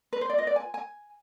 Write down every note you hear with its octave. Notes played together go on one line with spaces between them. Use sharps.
B4
C5
D5
F4 B4 D#5
D5
G#5
G#5